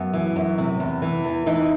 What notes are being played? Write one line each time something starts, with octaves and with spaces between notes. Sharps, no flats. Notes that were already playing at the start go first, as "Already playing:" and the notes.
Already playing: F#2 B3
E3
F#2
C3
E2
E3
E2
E3 D#4